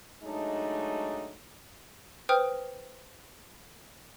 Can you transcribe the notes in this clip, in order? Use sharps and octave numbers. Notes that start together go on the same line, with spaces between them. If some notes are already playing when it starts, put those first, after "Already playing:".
F#3 G#3 A3 D4 D#4
B4 C5 G5 D#6 F6